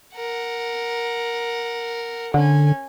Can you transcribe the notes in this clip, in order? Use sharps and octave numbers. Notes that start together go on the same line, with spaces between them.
A#4 F#5
D3 C#4 G#5